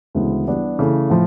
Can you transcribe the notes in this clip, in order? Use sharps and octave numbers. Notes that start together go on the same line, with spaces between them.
D2 C#3 E3 G#3 B3
E3 G3 B3 D4 G4
C#3 E3 A3
A2 F3